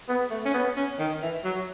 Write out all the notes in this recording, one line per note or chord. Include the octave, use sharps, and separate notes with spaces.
B3
A3
C#4
B3
C#4
D#3
E3
F#3